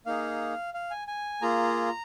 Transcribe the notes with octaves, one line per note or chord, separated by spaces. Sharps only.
A#3 D#4 G#4 F5
F5
G#5
G#5
A#3 F4 G#4 A#5